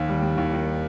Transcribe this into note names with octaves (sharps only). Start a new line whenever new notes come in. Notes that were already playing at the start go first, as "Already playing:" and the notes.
Already playing: D#2
G3
G3
D#2
D#3